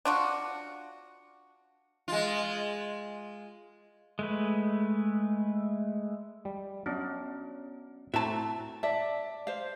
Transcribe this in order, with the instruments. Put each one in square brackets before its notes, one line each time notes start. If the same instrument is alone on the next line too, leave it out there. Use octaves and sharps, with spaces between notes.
[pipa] D4 F4 F#4
[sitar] G#3 F4
[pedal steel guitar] G#3 A3 B4
[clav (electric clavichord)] G3
[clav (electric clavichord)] F#3 D4 [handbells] B3 C#4
[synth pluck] A2 C4 F#4 [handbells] E4 A#5 [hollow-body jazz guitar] E5 A5
[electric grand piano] D5 A5 [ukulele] E5
[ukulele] C5 F5